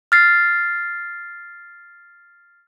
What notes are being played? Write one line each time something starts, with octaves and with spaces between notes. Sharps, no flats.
F6 A6 C7